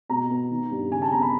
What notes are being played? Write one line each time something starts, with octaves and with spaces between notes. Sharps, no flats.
B2 A#5
B3
D#3
G2
C#3 G#5
A5
B3 A#5
B5